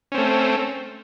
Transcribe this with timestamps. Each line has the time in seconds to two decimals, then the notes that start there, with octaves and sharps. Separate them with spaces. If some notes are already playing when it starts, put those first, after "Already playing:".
0.12 C#4
0.15 C4
0.17 A3